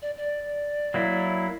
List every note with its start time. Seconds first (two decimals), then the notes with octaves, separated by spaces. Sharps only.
0.02 D5
0.17 D5
0.94 F#3 A#3 E4